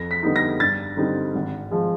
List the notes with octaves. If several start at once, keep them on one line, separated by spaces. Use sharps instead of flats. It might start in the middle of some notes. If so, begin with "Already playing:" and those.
Already playing: F2 A#6
B6
D3 G3 B3 D#4
A#6
G2 A6
D3 G3 C4 D#4
G#1
F3 G#3